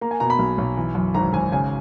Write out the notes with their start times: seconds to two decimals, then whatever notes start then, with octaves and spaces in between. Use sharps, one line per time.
0.01 A#3 A#5
0.11 G#5
0.20 B2 A#5
0.30 B5
0.39 B1
0.58 B1
0.77 E3
0.95 F#2
1.14 G#1 A#5
1.33 G#1 G#5
1.52 C#3 G#5